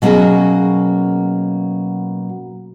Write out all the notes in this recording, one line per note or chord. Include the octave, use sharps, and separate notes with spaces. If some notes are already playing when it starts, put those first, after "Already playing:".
B2 F#3 A#3 C#4 F#4 G#4